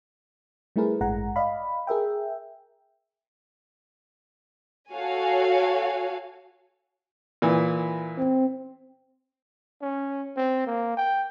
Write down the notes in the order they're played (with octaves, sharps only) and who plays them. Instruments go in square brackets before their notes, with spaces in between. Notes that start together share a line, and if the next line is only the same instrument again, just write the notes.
[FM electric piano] G3 A3 E4 G#4 A#4 B4
A1 G2 G#3 F#5 A#5
D5 D#5 F5 B5
G#4 A#4 E5 G5
[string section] F#4 A4 C#5 F5 G#5
[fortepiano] A#2 E3
[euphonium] C4
[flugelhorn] C#4
C4
A#3
G5